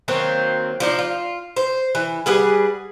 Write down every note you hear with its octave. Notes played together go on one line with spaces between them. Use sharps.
D#3 F#3 A#3 C4
F3 D4 D#4
F4
C5
E3
G3 G#4 B4 F#5